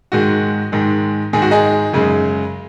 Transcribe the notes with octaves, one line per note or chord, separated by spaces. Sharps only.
G#2 D#3 G#3 F#4
G#2 D#3 G#3
G#2 D#3 G#3 G#4
F#4
D#4 G#4
F#2 C#3 G#3